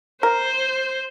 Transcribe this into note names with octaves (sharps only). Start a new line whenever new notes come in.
A#4 C5